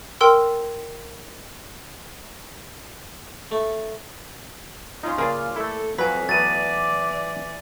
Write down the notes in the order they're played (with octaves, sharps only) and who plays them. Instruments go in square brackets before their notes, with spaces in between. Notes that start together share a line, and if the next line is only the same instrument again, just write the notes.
[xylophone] A#4 G5 C6 E6
[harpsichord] A3
[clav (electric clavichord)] C#4 D#4 [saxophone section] F4
[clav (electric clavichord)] C#3 [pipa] A#3 G#4 D5
[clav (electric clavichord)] A3 E4 [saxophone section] A4
[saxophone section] F2 [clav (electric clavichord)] F#3 [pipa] B4 [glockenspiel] G#5 B6
[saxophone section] E3 D5 [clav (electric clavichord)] F#3 A3 B3 [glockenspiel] A6 D#7